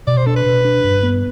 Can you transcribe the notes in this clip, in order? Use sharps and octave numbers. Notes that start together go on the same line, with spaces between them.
B2 D5
C5
D4 A4
B4
B2
D4
G2
B3